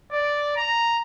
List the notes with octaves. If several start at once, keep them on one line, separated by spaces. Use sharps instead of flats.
D5
A#5